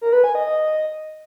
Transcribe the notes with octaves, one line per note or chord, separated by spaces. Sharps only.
A#4
B4
G#5
D#5
D#5